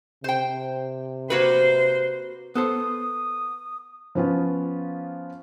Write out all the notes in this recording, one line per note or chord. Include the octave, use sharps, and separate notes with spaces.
C3 C5 G5
A#3 F#4 B4 C5
B3 A4 C5 D#6
F3 B3 C#4 F4